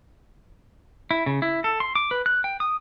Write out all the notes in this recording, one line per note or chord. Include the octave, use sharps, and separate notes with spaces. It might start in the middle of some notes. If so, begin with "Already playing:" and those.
E4
C#3
E4
A4
C6
D6
B4
F#6
G5
D#6